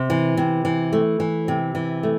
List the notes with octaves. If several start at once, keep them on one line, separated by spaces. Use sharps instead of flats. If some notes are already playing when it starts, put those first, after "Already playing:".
Already playing: C3
E3
C3
E3
A3
E3
C3
E3
A3